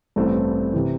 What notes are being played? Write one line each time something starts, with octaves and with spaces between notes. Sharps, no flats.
A1 G2 E3 A3 C4
C3 E3